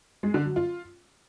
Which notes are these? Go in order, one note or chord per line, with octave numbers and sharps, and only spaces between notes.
G#3
D3
F#3
F4